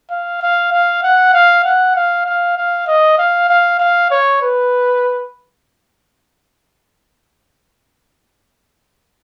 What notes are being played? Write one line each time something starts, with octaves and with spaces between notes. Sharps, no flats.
F5
F5
F5
F#5
F5
F#5
F5
F5
F5
D#5
F5
F5
F5
C#5
B4